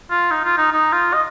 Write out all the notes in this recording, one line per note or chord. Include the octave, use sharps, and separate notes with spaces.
F4
D#4
F4
D#4
D#4
F4
D#5